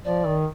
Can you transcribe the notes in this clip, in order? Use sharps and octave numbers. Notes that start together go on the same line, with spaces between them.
F3 D5
D#3